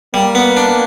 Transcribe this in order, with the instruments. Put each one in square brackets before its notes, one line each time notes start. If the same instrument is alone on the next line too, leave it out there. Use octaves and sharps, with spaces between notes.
[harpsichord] G3 [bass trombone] A#3
[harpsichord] B3
D4